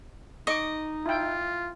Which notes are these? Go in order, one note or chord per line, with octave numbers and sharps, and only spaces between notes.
D#4 D#5 C#6 D6
E4 F4 G5